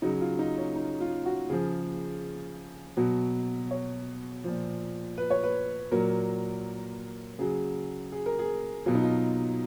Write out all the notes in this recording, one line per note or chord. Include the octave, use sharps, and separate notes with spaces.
C#3 F#3 D#4
F4
D#4
C#4
D#4
F4
F#4
C#3 F3 G#4
B2 F#3
C#5
A#2 F3
B4
C#5
B4
A#2 F#3 A#4
C#3 F#3 G#4
G#4
A#4
G#4
B2 F#3 F4
D#4
F4